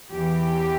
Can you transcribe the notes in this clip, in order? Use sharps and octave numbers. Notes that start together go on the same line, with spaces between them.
E2 E3 G4